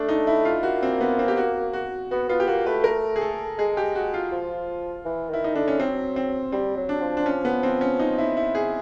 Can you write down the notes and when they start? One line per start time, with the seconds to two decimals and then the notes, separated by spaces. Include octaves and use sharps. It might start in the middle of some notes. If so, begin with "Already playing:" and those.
Already playing: A3 D4
0.09 D#4
0.27 E4
0.45 F4
0.63 A#3 F#4
0.83 C4
1.01 B3
1.19 C4
1.28 G4
1.37 F#4
1.73 F#4
2.11 B3 F#4
2.29 B3 F4
2.40 G4
2.47 A#3 F#4
2.66 A3 B4
2.84 A#4
3.16 G#4
3.21 A4
3.58 G#3 G#4
3.77 G4
3.95 F#4
4.14 F4
4.32 F3
5.05 E3
5.30 D#3 E4
5.44 D#4
5.55 D3 D4
5.68 C#4
5.79 F#3 C4
6.16 C4
6.52 G3 C4
6.77 F#3
6.89 D4
7.02 F3
7.17 D4
7.26 C#4
7.45 B3
7.63 C4
7.81 C#4
7.99 D#4
8.18 E4
8.37 E4
8.55 G#4